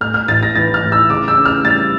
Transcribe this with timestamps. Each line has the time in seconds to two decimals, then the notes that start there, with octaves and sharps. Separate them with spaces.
0.01 A2 F6
0.14 F6
0.28 A1 A6
0.43 A#6
0.55 E3 A6
0.74 F6
0.82 A1
0.92 E6
1.10 C#3 D6
1.28 E6
1.37 C#4
1.45 F6
1.64 G3 A6